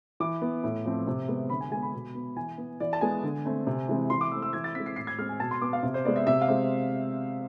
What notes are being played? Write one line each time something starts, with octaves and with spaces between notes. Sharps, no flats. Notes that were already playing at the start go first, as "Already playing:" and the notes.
E3 D6
B3
A2
F3 A3 C4
C3
G#3 B3
D3 B5
G#5
G#3 B3 G#5
B5
B2
B3
E3 G#5
B3
E3 D5
A5
G#3 B3 G#5
D3
A3 C4
C3
E3 G#3 C4
E3 C6
D6
A3 C4 E6
E6
E3 G#6
A6
G#3 C4 B6
C7
A2 C7
G#6
G#3 C4 F6
G#5
B2 A5
C6
B3 D6
F5
C3
C5
G#3 B3 D5
E5
C3 E5
F5
G#3 C4